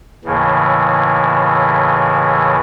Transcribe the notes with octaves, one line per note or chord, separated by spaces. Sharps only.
D#2 A2 C#3 E3